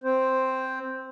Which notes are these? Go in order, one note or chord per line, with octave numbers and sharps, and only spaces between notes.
C4 C5